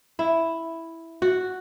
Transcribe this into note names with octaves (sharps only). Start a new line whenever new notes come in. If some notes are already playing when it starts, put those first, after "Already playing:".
E4
F#4